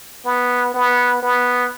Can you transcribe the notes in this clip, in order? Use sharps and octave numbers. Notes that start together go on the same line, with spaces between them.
B3
B3
B3